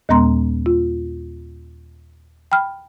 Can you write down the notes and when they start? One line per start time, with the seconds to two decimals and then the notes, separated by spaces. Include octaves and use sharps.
0.09 D#2 A#2 G#3 B3 A#5 C6
0.66 F4
2.52 G5 B5 F6